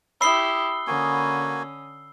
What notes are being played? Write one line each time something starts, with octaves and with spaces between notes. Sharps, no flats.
E4 G4 B5 D#6 E6 C7 G7
D3 A#3 C#4 F#4 G#5